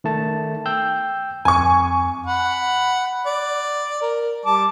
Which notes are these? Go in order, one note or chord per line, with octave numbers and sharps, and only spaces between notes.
D#3 A3 A5
G5 E6 G6
F2 G#5 C#6
F#5 B5
D5
A#4
G3 A5 D6